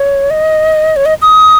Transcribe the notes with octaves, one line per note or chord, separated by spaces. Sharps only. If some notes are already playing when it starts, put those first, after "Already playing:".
Already playing: C#5
D#5
C#5
D#5
D#6